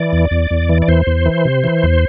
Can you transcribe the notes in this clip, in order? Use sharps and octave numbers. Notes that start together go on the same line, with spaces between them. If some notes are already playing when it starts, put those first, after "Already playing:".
Already playing: E3 D5
E2
E2
E2
E3
D5
E2 C5
E2
E3
C3
E3
E2